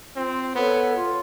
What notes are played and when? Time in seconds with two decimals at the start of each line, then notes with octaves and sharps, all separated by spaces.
0.16 C4 F4
0.55 B3 A4 C#5
0.94 F4